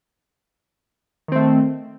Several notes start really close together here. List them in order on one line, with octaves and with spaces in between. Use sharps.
D#3 C4 A3